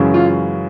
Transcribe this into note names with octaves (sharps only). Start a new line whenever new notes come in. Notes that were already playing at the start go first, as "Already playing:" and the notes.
Already playing: F#2 C#3 E3 G#3
F4